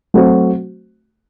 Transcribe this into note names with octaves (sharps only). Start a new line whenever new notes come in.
F#3 A3 C4 F#4 C5